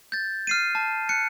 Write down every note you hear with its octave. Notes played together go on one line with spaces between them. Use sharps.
G6 A6
F6 C7 D#7
A5
F#6 C#7